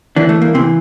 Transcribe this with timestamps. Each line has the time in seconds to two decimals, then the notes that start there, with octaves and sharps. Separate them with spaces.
0.16 D3 E3 D4
0.29 A3
0.42 A#3
0.54 C3 E3 C4